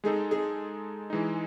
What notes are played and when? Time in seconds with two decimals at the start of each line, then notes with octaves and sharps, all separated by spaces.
0.04 G#3 D#4 G#4 A4
0.31 G#4
1.10 E3 G#3 D#4